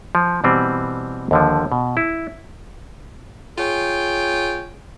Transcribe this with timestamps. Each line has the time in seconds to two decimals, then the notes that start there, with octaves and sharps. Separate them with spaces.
0.15 F3
0.44 B2 E3 G3 C4
1.31 D#2 D3 F3
1.72 B2
1.97 E4
3.58 F4 G#4 C#5 G5